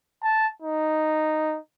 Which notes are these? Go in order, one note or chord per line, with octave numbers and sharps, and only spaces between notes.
A5
D#4